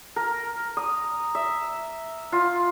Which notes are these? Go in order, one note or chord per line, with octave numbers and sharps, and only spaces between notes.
A#4
D#6
E5
F4